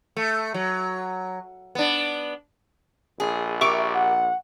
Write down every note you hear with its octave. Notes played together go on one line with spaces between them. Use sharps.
A3
F#3
B3 D4
A#1 G#4
G4 A#4 E5 C#6 D6
F#5